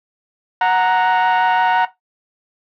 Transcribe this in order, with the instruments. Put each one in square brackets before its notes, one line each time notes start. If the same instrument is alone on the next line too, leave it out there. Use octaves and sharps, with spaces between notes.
[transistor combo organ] F#5 A#5